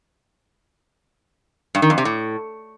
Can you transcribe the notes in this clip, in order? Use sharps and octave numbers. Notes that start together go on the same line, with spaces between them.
G2
D#3
F2
C3
A2